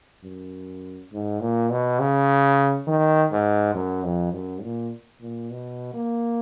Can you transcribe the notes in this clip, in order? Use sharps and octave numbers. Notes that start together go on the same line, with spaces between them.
F#2
G#2
A#2
B2
C#3
D#3
G#2
F#2
F2
F#2
A#2
A#2
B2
A#3